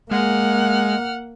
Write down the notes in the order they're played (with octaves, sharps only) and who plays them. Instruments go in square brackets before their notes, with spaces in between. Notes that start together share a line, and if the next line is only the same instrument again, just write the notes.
[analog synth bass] G#3 [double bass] A#3 [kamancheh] F#5 F6